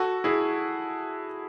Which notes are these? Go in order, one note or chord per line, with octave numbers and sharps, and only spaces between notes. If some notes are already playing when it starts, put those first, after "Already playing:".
Already playing: F#4 A4
E4 G#4